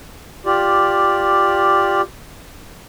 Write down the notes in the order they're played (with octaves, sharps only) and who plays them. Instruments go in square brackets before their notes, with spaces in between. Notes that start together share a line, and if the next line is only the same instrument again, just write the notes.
[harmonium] F4 G4 D5